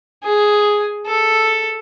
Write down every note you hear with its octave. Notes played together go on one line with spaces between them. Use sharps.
G#4
A4